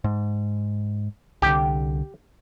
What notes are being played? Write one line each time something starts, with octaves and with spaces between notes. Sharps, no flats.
G#2
C2 D3 G4